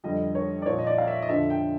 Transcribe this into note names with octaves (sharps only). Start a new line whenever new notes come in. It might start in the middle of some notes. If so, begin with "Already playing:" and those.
F2 D3 G3 D#5
C#5
D5
A#2 F3 C#5
D#5
D5
F5
E5
D#5
F2 D3 F3 E5
G5